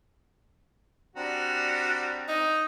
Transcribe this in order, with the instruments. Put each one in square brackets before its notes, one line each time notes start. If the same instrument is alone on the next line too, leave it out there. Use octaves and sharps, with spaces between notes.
[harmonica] G3 F#4 [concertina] C4 D4 A#5
[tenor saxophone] D#4